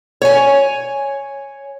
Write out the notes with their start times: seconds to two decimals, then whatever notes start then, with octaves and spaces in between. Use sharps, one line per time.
0.22 C#5 G#5